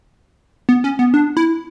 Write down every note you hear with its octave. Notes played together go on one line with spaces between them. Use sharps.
B3
C#4
B3
D4
E4